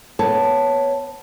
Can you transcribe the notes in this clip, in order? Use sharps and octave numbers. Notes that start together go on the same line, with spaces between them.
B3 C#5 A5